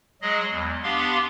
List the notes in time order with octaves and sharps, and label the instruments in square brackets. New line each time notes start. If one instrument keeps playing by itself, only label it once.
[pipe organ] F#3 G#3 G#4 D#5
E2
B3 D4 G4 F5 C6